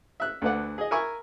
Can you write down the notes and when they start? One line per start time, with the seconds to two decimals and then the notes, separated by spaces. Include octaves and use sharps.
0.20 E5 F#6
0.42 D2 A4 B4 D5 F#5
0.78 G#4 D#5
0.91 A#4 E5 G#5 B5 C#6